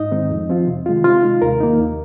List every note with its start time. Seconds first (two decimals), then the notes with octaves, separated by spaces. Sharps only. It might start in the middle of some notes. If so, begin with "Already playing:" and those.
Already playing: G#2 D#4 D#5
0.12 D#3 G#3 C4 D#4
0.30 F2
0.49 F3 C4 F4
0.67 C3
0.86 D#3 G#3 F4
1.04 C3 F4 F5
1.23 G#3 D#4
1.42 D#2 A#4
1.60 D#3 A#3 D#4
1.80 D#2